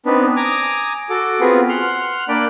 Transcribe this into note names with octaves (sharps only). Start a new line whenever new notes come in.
B3 C4 D4 D#4 B4
G#5 A#5 D6 D#6
F#4 A4 D6
B3 C4 F4 F#4 G#4 B4
F#5 C6 F6
A#3 D4 D5 G5 B5 F#6